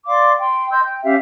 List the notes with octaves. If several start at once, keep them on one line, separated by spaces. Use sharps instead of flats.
D5 F5 C6 D6
G5 C6
D#5 C6 E6 G6
G5
C#4 G4 E5 F5